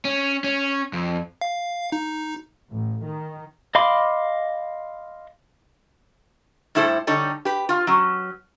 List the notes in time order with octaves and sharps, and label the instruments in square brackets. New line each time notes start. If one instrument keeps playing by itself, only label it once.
[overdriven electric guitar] C#4
C#4
F2
[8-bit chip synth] F5
D#4
[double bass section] A1
D#3
[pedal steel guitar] D#5 F5 B5 C6 D6
[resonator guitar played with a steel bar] A2 G3 E4 A4 C5
D3 G3 D#4 A4 C#5
G4 B4
F4 F5
F#3 C#4